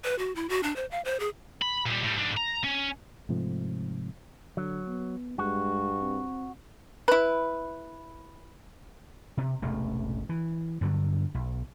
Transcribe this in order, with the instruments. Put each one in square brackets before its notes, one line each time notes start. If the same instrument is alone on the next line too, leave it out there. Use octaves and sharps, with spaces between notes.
[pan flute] B4
F#4
E4
F#4
D4
C5
F5
C5
G#4
[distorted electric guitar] B5
A#2 G3
A2 G3
G#2 D4
A#5
C#4
[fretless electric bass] G#2 C3 F3 A3
[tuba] D3 [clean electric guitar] F#3
[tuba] B3
[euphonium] G2 [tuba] G#3 [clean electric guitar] F#4
[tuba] C4
[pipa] E4 B4
[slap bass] C3
E1 A1 C3 A3
E3
G2 D3 F#3
B1